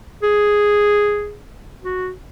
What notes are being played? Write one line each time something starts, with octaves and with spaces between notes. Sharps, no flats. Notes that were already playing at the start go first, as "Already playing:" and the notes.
G#4
F#4